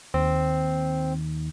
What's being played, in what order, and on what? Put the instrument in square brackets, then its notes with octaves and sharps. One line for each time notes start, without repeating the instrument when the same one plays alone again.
[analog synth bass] D#2 [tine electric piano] C4